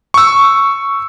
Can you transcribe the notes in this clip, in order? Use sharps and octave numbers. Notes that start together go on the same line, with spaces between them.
C#6 E6